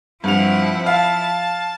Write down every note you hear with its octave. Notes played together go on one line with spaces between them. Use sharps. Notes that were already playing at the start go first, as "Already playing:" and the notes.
G2 F3 C4 E4 F#5 F7
F5 A5